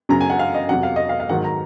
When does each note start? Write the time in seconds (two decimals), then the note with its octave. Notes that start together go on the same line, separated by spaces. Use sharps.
0.09 F#2 C#3 F#3 A#5
0.21 G#5
0.30 F#5
0.39 F5
0.55 D#5
0.69 F2 C3 F#3 F#5
0.83 F5
0.96 D#5
1.09 F5
1.20 F5
1.29 G#2 D#3 F#3 F#5
1.44 A#5